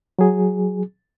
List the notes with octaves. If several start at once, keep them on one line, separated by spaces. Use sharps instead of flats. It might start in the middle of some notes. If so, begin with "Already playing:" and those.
F#3 G#4